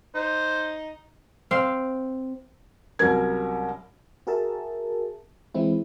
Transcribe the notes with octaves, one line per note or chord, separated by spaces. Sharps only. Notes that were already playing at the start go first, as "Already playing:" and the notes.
D#4 C5
C4 F5
C2 F#3 C#4 A#4 G#6
F#4 G#4 A#4 E5 A5
E3 G#3 C4 E4